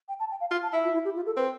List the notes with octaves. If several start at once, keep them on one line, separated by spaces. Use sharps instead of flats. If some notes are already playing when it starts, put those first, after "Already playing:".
G5
A5
G5
F5
F4 F5
A5
E4 E5
F4
E4
G4
F4
A4
C4 B4